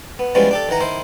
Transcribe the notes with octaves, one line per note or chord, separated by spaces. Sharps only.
B3
E3 F3 G3 G#3 B3 C#4
D4 G4 A4
D#3 E3 F#5 A#5
D#3 E4 C5